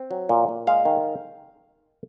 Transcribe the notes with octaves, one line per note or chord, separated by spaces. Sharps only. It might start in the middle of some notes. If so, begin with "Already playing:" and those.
Already playing: C4
F#3
A#2
A#2
G#3 F5
D#3